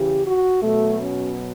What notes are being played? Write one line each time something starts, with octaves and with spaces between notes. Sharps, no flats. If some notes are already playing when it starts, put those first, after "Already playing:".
Already playing: C#3 E3 G4
F#4
B2 F#3 A3
C#4